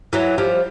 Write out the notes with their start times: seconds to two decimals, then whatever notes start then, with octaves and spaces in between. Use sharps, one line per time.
0.13 E3 F#3
0.38 F3 G3